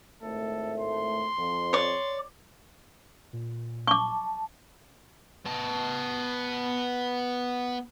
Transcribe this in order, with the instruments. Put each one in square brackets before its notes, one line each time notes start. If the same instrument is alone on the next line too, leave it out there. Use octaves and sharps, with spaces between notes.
[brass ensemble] G#1 A2 A3 [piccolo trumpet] A4
[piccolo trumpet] C6
[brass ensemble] F2
[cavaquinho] C#5 D5
[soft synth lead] A#2
[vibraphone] A5 [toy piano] C#6 D6
[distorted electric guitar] B3 A5